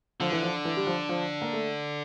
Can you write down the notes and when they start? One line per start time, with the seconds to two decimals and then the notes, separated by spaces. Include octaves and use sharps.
0.20 D3 F3
0.32 E3
0.42 F3
0.65 E3
0.77 G3
0.86 F3
1.09 F3
1.42 A#3
1.53 A3